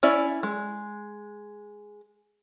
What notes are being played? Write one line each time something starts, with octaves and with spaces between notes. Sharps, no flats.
C#4 E4 D5
G#3